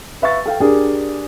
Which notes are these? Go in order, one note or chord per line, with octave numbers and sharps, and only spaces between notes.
B4 E5 F5 C#6 A6
A4 F5 G5
D4 G4 G#4 A#4